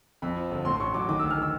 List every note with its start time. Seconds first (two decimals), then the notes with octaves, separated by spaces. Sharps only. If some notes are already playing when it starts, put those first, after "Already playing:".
0.22 F2 B5
0.37 F3
0.51 G1
0.65 A2 C6
0.75 C6
0.80 A1 C#6
0.94 F#3 D6
1.09 D#3 D6
1.19 D2 E6
1.30 F6
1.38 D#3 E6